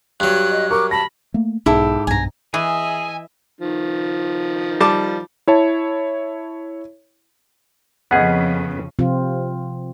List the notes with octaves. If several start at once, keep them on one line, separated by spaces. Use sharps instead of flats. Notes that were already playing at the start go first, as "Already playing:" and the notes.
G2 F#3 F#6
D#5
A#4 C#6 D6
A5 B5 A#6
A3 A#3
B1 G#2 E4 G4 A4
B1 G2 G#5 A#5
E3 G#4 D#5 E5 G#5
D#3 F3
G3 A5 D6
E4 C#5 A5
F2 C#3 B3 C#4 G#4 D#5 F#5
C3 F3 C4 F4